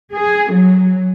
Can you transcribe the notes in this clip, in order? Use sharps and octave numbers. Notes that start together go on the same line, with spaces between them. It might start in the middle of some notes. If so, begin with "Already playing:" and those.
G#4
F#3